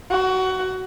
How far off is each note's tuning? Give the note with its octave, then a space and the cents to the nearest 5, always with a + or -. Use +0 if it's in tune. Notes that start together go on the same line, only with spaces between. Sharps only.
F#4 +20